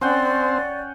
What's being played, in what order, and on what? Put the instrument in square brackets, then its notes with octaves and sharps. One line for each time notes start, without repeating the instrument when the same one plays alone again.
[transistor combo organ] C4 [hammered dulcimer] C#4 F#5 G5 [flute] D5